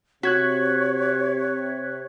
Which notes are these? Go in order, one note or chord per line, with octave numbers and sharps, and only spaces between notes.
C3 F#4 C#5 F#6 G#6 B6